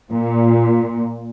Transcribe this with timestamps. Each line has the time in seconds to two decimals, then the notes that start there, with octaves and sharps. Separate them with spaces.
0.12 A#2